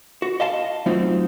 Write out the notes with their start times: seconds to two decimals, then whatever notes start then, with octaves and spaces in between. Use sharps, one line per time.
0.22 F#4
0.40 D#5 F5 A5
0.86 F#3 A3 C4 D#4 F4